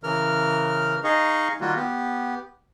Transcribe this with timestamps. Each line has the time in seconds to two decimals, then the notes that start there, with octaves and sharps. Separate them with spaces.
0.03 C#3 E3 A#4 F6
1.04 D#4 G#4 D#5 F5 C#6
1.61 D#3 G3 A#3 F4 F#4
1.76 B3 G4